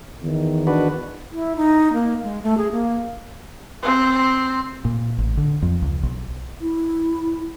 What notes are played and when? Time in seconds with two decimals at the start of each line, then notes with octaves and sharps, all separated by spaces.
0.22 E2 D#3
0.67 D4 F#4 B4
1.32 E4
1.56 D#4
1.93 A#3
2.23 G#3
2.43 A3
2.57 G#4
2.72 A#3
3.83 C4
4.85 A#2
5.18 A1
5.37 D3
5.62 F2
5.82 C#2
6.03 B1
6.61 E4